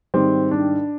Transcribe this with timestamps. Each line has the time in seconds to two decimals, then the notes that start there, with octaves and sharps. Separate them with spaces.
0.14 G#2 D#3 G3 C4
0.51 D4